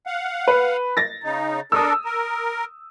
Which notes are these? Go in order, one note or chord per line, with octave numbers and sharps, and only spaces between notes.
F5 F#5
B4
A6 A#6
C#3 D#4
D4 A4 A#4 D#6 E6
A#4